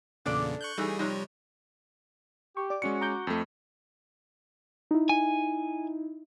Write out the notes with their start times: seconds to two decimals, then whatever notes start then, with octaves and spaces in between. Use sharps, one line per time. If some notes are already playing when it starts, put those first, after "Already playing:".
0.26 E2 A#2 C#3 D4 A4 D5
0.61 C#6 F#6 G6
0.78 E3 G3 A3 D#4 G#4
0.99 C3 F3 G3 D#4 C#5
2.57 G4 C#6
2.70 D5 D6
2.82 G#3 C#4 F#4 C#7
3.01 A#5 D6 G6
3.27 F2 A3
4.91 D#4 E4
5.09 G#5